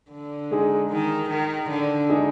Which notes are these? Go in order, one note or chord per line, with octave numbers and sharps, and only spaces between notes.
D3
G#3 D#4 G#4
D#3
D#3
D3
G#3 D#4 G#4